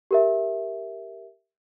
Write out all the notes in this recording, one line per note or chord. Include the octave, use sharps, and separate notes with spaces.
G4 A#4 E5